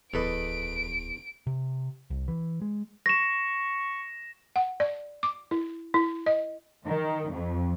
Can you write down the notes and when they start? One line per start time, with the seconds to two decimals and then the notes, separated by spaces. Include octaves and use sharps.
0.14 D1 E2 A4 B4 D#5 D7
1.47 C3
2.10 C2
2.28 E3
2.62 G#3
3.06 C#6 A#6 E7
4.56 F#5
4.80 D5
5.23 D6
5.51 E4
5.94 E4
6.26 D#5
6.87 D#3
7.31 F2